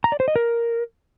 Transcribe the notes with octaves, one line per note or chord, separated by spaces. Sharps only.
A#5
D5
C5
D#5
A#4